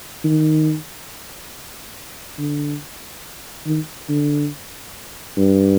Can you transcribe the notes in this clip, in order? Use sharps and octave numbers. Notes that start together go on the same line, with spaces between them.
D#3
D3
D#3
D3
G2